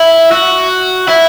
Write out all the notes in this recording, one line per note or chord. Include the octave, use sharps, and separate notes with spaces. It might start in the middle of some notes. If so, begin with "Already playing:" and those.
Already playing: E4
F#4
E4